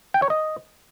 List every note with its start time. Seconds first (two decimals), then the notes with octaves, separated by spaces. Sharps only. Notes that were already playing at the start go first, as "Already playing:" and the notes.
0.14 G5
0.22 C#5
0.30 D#5